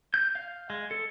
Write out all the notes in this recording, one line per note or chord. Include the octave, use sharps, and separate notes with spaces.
G6
F5
G#3
A4